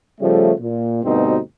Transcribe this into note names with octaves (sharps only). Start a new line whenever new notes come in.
C#3 F3 G3 A3
A#2
D2 G2 B2 C4 D#4 C5